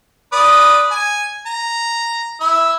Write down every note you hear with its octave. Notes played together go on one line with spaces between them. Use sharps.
B4 D5 D#6
G#5
A#5
E4 E6